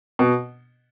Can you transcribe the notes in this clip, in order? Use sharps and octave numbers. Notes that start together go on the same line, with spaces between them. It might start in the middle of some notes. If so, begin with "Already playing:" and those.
B2